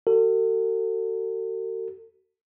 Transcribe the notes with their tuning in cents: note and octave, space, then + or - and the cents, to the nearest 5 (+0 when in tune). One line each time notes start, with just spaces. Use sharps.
F#4 +35 A4 +40